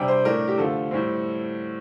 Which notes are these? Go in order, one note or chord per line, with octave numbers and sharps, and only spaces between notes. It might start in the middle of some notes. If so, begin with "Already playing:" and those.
Already playing: C3 G3 D4 G5
C5
A2 A3 D4 A#4
G4
D3 F3 A3 A4
A2 G3 C4